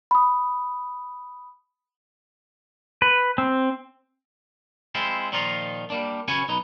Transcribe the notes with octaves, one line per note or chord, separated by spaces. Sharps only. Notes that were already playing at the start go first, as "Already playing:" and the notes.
B5 D#6
B4
C4
G#3 C4 E4 F4
A#2 D#3 F3 D#4 F4
G3 A#3 D4
C#3 C#4 F#4 B4 C#5 G#5
B1 D#4 B4